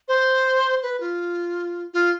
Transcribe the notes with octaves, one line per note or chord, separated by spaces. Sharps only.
C5
B4
F4
F4